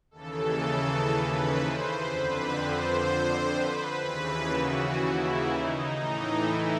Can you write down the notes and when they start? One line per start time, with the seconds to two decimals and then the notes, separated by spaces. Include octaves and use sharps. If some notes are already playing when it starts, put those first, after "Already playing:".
0.11 D#2 C#3 E3 A4
1.09 B4
1.56 C5
2.05 F2 D3 B4
2.53 C5
3.51 B4
3.99 D#2 C#3 E3 B4
4.48 F#4
4.96 E4
5.45 D#4
5.92 A2 E3 D#4
6.42 E4